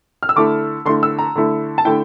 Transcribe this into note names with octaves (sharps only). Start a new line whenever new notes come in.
F6
E6
D3 A3 E4 D6
D3 A3 E4 C6
E6
A#5
D3 A3 E4
A5
D3 A3 E4 G5